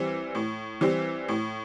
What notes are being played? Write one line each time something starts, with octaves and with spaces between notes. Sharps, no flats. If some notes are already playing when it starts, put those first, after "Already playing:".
Already playing: E3 G3 C4
A2
E3 G3 C4
A2